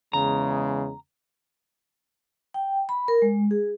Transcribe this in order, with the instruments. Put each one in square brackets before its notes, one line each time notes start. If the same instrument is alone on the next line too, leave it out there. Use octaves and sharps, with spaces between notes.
[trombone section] E2 C#3 G#3 [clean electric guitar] A#5
[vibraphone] G5
B5
A#4
G#3
G#4